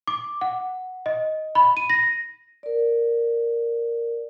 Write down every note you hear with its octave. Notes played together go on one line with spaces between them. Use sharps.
D6
F#5
D#5
B5
D#7
A#6
A#4 D5